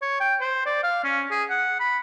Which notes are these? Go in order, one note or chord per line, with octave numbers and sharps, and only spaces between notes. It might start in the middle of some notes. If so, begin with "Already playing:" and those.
C#5
G5
C5
D5
F5
C#4
G#4
F#5
B5